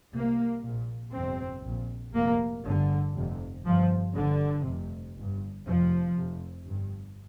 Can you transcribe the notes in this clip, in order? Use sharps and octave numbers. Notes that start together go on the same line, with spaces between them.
C2 C3 A#3
A#1 A#2
G1 F2 C3 C4
A#1 A#2
F1 F2 C3 A#3
G1 G2 D3
F1 F2 C3
G1 G2 F3
G1 G2 D3
F1 F2 C3
G1
G2
F1 F2 C3 F3
F1 F2 C3
G1 G2